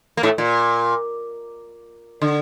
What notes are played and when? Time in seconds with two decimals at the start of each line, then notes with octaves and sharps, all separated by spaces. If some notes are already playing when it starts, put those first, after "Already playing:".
0.17 A#3
0.23 A2 A3
0.38 A#2
2.22 D3